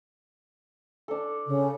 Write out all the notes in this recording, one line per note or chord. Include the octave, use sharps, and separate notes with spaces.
D4 A4
C#3